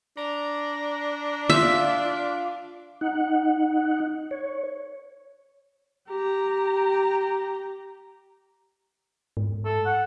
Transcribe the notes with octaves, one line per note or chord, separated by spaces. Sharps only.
D4 A#5
F4 E5
D#4 F#5
C#5
G4 A#5
G#2
A4
F#5